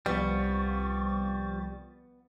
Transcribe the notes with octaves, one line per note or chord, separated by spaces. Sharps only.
C2 F3 G3 B3 C#6 A6